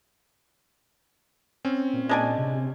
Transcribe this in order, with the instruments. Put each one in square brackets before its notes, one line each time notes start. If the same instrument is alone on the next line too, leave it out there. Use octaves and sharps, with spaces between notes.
[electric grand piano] C4 C#4
[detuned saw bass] A#2
[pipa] G#3 D4 G#5
[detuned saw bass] C3